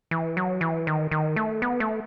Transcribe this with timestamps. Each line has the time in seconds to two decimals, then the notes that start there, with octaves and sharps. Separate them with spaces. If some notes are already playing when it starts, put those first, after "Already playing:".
0.11 E3
0.37 F#3
0.61 E3
0.87 D#3
1.11 D#3
1.36 A3
1.62 B3
1.80 A3